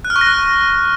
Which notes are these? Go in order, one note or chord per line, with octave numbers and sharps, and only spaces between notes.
F#6
F6
C#6
A#6
F#6